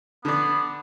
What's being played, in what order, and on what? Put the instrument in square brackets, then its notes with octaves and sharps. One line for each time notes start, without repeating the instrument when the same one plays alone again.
[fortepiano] D3 D4 [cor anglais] B3